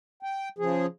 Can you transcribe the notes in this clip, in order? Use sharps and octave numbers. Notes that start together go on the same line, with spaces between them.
G5
C#3 F3 G#4